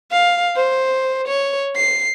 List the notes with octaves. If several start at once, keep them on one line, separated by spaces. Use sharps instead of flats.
F5
C5
C#5
C7